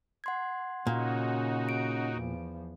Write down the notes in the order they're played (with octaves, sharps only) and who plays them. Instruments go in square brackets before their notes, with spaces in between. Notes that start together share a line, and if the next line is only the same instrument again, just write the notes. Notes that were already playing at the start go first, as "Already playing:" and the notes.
[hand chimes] F#5 C6 G#6
[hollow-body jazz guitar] A#2 [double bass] C#3 C#4 [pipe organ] D#4 F#4
[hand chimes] D7
[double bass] E2 F3